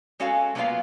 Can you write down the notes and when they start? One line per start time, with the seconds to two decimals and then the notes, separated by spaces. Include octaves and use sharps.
0.20 G#3 C#4 F#4 A4 F5
0.55 F#3 A#3 B3 D#4 F4 F5